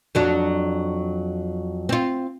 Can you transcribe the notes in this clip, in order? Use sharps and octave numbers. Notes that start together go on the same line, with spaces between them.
F2 F#3 D4
C4 F4